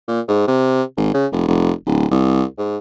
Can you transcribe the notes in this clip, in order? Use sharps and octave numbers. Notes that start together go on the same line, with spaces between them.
A#2
G#2
C3
G#1
C#3
F1
F1
D1
C2
G#2